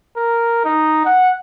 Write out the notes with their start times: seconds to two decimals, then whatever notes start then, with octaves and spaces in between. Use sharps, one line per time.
0.17 A#4
0.64 D#4
1.06 F#5